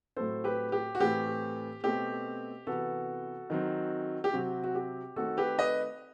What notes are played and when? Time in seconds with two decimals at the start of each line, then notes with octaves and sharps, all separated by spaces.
0.17 A2 F#3 A3 C4 A4 C5
0.44 G4 B4
0.72 G4
0.95 F#4
1.00 A2 E3 A3 C4 G4
1.84 B2 A3 C4 G4
2.67 C3 E3 B3 F#4 A4
3.50 D#3 F#3 C4
4.24 G4
4.33 C3 F#3 C4 F#4
4.64 F#4
4.75 G4
5.16 D#3 A3 C4 F#4 A4
5.37 G4 B4
5.58 B4 D#5